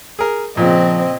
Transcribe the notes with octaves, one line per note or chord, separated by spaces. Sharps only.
G#4 A#4
A#2 C#3 F3 C4 D#5